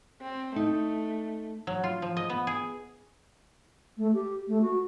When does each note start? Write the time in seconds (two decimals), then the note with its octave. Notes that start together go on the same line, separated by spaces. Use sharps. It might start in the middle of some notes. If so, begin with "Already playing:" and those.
0.21 C4
0.56 A3 D#4
1.67 F#3
1.84 F4
2.02 F3
2.17 D#5
2.30 B3
2.47 G#4
3.97 A3
4.14 G4
4.48 A3
4.62 F#4